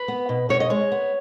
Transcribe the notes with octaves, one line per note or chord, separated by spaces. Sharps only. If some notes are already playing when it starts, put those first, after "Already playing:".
Already playing: B4
B3
B2
B2 C#5
D#5
G#3 C#5
B3